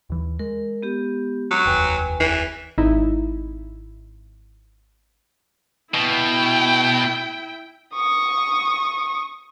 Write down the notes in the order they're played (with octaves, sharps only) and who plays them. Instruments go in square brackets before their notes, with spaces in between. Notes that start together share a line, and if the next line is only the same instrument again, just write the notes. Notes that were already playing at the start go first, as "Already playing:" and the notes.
[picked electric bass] D#2 E3
[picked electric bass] G#3 [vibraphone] A#4
[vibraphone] B3 G4
[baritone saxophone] F#3 [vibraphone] C#6 D6
[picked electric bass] F1 D#2 [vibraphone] B4 G5 G#5
[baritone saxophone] E3
[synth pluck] G#1 D#4 E4
[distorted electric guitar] B2 [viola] E4 G5
[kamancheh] C#6 D#6